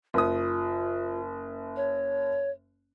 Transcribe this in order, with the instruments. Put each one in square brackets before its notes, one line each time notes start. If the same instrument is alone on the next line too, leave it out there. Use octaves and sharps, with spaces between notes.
[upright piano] F#1 D#6 [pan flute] F4
[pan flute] C#5